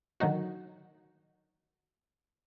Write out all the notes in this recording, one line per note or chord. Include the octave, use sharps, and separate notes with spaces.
D3 D#3 F#3 D#4 F#4